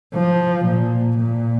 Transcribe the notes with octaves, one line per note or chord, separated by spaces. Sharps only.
F3
A#2
A#2